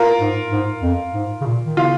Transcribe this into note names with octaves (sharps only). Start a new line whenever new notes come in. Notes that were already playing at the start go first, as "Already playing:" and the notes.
Already playing: F4 A#4
G#2
G#2
F2
G#2
C#3
A#2
D#3
C#3 F4